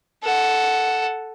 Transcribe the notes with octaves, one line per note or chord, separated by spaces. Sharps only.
A4 F#5